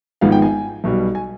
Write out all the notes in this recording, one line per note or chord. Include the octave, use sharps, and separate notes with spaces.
G#1 G#2 F3 G#3 B3 F5
G5
G#5
B1 B2 G3
G#5